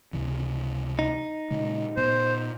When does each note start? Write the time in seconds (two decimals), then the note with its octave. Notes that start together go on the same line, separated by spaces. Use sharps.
0.13 C#2 C3 E3
0.99 D#4
1.51 A#2 C#3 G#3
1.97 A#2 B3 C5